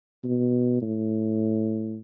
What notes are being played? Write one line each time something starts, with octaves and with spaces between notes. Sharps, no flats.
B2
A2